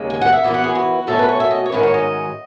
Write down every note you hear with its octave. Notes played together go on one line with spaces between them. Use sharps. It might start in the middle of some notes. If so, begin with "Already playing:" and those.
Already playing: D#2 C#3 G#3
G#5
F#5
E5
F#2 E3 B3 E4 E5
F#5
G#4
F#4
B2 F#3 A3 C#4 E4 A4
B4
C#5
E5
D#5
C#5
G#2 D#3 F#3 C#4 B4
C#5
D#5